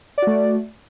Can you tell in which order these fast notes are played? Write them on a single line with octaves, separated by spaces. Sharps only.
D5 F#4 A3